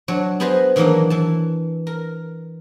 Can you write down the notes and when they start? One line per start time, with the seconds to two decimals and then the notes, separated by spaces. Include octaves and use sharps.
0.08 F#3 D4 C#5
0.40 B3 G#4 B4 C5 D#5
0.76 D#3 E3 F#3 A#3 D4 D#4
1.10 E3 A5
1.87 A#4